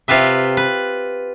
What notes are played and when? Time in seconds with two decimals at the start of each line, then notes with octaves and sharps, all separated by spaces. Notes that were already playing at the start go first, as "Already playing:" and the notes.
0.08 C3 F4 G4 B4 E5
0.57 B4